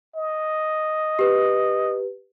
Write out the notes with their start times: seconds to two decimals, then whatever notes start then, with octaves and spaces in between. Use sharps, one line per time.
0.16 D#5
1.19 G4 B4